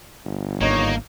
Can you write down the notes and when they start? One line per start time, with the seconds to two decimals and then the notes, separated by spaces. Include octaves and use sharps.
0.25 G1
0.61 G#1 A#3 D4 D#4 C#5